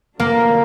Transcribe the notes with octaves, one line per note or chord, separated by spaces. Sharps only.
D3 F#3 A#3 D4 F4 A#4